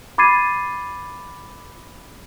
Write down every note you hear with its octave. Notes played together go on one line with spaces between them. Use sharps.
B5 D6 G#6 A6 C7 D#7